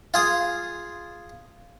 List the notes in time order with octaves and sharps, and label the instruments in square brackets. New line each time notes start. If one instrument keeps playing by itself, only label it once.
[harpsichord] F4 G#4 D#6